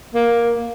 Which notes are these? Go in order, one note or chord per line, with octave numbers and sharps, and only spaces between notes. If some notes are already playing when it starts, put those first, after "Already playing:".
A#3